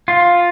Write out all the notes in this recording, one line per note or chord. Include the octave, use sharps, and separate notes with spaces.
F4